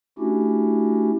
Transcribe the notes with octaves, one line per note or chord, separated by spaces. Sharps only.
A3 C#4 D4 E4 F#4 G4